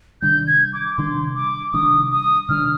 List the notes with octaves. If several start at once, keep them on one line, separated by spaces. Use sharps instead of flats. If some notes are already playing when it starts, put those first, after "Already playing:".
C3 D#3 G3 D4 G6
G#6
D6
C3 D#3 G3 D4 C6
D6
C3 D#3 G3 D4 D#6
D#6
C3 D#3 G3 D4 F6